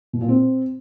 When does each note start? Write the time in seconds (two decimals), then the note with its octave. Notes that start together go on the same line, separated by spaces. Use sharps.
0.13 B2
0.21 A#2
0.29 C4